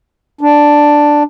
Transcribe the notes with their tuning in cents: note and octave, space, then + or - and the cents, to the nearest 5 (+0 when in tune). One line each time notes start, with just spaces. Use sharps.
D4 +0